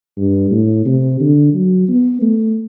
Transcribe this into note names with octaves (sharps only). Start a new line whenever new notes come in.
G2
A2
C3
D3
F#3
B3
A3